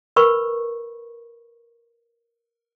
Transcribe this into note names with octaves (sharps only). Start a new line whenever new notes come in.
A#4 B4 B5 C#6